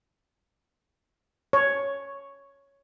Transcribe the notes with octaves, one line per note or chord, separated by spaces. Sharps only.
C#5